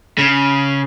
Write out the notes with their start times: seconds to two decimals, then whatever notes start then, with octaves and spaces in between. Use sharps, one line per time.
0.18 C#3